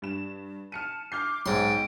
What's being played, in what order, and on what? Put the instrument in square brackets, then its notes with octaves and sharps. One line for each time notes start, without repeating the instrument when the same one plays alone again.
[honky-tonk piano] G2 E7
[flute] A5 [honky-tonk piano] F6 C#7 D#7
[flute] D6 [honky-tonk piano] F6 G6 C7
[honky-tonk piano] B1 C#5 [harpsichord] G#2 C6 [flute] G5